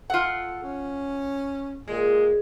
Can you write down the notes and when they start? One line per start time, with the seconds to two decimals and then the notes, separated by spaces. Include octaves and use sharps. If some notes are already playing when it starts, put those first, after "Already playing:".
0.10 F4 A4 F#5
0.63 C#4
1.88 A#2 G#3